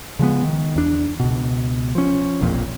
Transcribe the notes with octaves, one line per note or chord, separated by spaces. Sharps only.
C#3 F3 G#3 B3
D#3
E2 D4
C#2 B2
F3 C#4
E1 A#1 F2 A#2